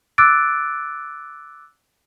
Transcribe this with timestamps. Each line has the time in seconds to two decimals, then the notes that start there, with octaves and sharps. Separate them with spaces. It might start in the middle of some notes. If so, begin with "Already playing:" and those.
0.18 D6 E6 F#6 A6 D7